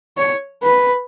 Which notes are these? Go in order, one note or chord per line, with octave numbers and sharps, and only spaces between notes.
C#5
B4